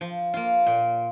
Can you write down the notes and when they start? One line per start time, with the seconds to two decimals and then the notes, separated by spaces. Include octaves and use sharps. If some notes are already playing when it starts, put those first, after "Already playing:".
0.01 F3
0.34 A#3 F4
0.66 A#2